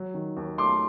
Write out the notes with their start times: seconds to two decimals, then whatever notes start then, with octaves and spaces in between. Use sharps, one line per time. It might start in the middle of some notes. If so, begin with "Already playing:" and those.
Already playing: F#3
0.14 D#3
0.37 D#2
0.58 A3 C6 D6